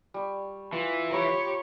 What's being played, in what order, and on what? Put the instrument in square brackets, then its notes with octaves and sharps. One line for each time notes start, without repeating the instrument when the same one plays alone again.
[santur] G3 C#6
[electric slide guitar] E3 [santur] F4
[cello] G4 C#5 [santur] A#4 A#5 B5